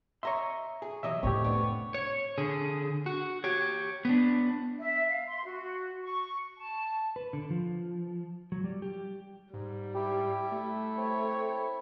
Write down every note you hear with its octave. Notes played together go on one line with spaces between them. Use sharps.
C#5 D#5 E5 A#5 C6 C#6
G#4
C3 E3 F#3 D#5 E5
F1 A2 D3 C4 G4 C#5
B3 D4
C#5
D3 G#4
F#4
G4 C#5
B3 D4
E5
F5
C6
F#4
C#6
A5
B4
D3
F3
F#3
G3
G4
G#2 G3
E4 G4
A3
C4 C#5